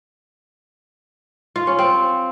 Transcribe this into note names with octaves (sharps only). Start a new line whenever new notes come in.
F4
C#4
C4